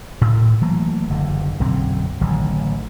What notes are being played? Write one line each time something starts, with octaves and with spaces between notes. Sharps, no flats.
A2
E3 F#3 A3 A#3
F#1 G2 D3
B1 F#2 D3 C4
A1 D3 D#3 F#3